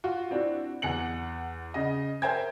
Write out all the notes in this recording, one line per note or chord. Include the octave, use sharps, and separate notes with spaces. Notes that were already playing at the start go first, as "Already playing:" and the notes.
F4 F#4
C4 D4 E4 F#4
E2 F#5 C#7 F#7
C#3 D#5
A#4 C5 E5 G5 G#5 G#6